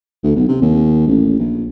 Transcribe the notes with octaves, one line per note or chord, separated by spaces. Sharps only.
D2
B1
C3
D#2
A1
A#1